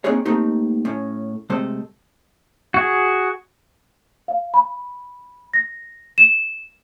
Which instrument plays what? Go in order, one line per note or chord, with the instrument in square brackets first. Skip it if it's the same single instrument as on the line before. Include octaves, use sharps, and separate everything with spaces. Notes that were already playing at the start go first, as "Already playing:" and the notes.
[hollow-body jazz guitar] A#3 C4 D4 D#4 G#4 C#5
A3 A#3 C4 D#4 G4
A2 C#4
C3 G#3 A3 A4 C5
[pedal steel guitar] F#4 G#4
[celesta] F5
B5
A#6
E7